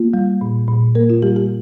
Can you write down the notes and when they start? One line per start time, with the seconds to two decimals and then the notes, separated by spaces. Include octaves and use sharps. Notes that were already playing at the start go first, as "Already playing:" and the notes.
Already playing: A#3 F4
0.14 G3
0.41 A#2
0.68 A#2
0.95 A#3 A#4
1.10 F4
1.22 G3 G4
1.36 G4